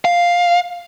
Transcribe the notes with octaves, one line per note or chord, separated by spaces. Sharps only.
F5